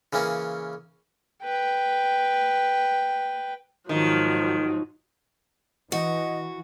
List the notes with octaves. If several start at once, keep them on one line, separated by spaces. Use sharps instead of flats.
C#3 E3 A#3 C#4
B4 G5
G#2 D#3 F3 F#3
E3 F#4 D#5